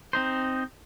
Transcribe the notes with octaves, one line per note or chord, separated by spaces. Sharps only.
C4 D#4 C5